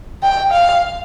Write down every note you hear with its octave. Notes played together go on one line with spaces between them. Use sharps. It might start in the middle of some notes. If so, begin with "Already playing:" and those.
G5
F5